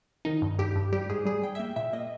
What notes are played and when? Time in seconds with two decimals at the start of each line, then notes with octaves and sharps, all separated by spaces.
0.25 D#3 D#4
0.42 G2
0.59 G2 G4
0.76 G2
0.92 G3 G4
1.10 G#2 G#4
1.25 G3 G#4
1.43 G3 G5
1.55 E5
1.59 A#3 G5
1.76 A#2 E5
1.93 A#3 D#5